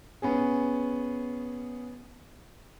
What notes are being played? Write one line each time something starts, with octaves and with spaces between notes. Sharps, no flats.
B3 C#4 G#4